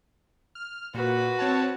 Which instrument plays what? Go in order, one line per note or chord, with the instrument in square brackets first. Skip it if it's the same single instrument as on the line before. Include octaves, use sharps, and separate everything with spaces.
[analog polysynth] F6
[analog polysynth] A#2 [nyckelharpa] F#4 B4
[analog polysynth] C4 C#5 A5